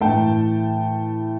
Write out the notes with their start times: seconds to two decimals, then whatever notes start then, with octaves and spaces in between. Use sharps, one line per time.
0.01 A2 E3 A3 G5 A5